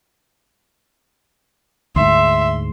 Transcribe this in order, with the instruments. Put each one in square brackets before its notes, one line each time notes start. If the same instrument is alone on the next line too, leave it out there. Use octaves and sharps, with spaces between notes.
[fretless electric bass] D2 G#2 [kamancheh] E5 [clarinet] C6